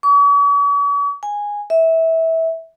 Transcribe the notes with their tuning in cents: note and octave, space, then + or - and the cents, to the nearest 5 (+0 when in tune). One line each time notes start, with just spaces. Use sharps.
C#6 +45
G#5 -10
E5 -20